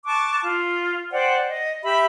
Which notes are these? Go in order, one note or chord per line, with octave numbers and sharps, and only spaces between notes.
A5 C#6 D6 F#6
F4
C5 D5 F#5 G5
D#5
G4 E5 B5